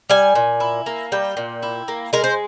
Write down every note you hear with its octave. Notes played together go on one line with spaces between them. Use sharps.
G3 G#5
A#2
E4
A#3
G3 G5
A#2
E4
A#3
G#3 A#4
C5